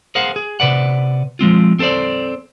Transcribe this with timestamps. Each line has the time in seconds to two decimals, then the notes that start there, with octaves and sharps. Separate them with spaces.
0.15 G#4 A#4 C5 F5 F#5
0.36 G#4
0.60 C3 B4 D5 F#5
1.39 F3 G#3 C4 F4
1.79 C4 A4 A#4 C5 D5